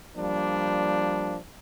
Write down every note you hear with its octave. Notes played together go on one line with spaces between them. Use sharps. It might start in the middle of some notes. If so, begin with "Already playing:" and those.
F3 G3 A#3 D4